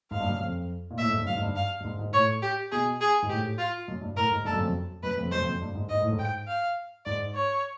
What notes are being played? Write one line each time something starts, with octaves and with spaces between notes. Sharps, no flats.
G#2 F5
G2
F#2
F2
A#2
A2 E5
G#2
G2
F#2 F5
G#2
G2
F5
G2
G#2
G#2
A2 C#5
G4
B2 G#4
G#4
G#2
A2 G4
F4
F#2
G2
A2 A#4
G#2
G2 A4
F#2
F2
F#2
F#2 B4
F2
F#2 C5
F2
F#2
G2
G#2
G#2 D#5
A2
G#2
G5
F5
G#2 D5
C#5